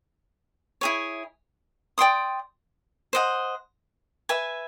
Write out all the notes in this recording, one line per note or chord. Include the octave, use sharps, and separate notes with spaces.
E4 G#4 C#5
D5 G5 C6 D#6
C5 D#5 F#5
B4 E5 G#5